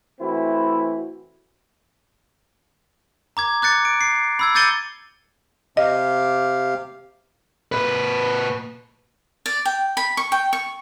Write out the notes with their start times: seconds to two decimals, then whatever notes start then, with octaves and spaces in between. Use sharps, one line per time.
0.20 E3 A3 C4 E4 F#4
3.37 A#5 D6 G#6
3.62 D6 F#6 A6 C#7
3.85 D7
4.01 C7
4.39 B5 E6 G#6
4.55 D6 G6 A6 C#7 D#7 G7
5.77 C3 G4 D#5 F5
7.72 A#2 B4
9.46 D5
9.65 G5
9.97 B5
10.17 C#6
10.32 G5
10.53 C#6